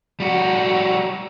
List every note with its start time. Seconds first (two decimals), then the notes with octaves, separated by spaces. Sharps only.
0.20 G3 F#4